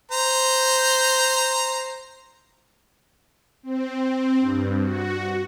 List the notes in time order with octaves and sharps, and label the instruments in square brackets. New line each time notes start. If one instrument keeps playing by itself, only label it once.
[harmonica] C5 A#5
[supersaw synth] C4
G2
F#4